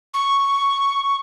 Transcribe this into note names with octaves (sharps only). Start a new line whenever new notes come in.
C#6